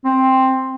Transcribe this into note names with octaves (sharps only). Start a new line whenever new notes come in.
C4